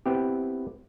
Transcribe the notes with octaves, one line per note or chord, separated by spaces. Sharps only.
B3 C4 E4 G4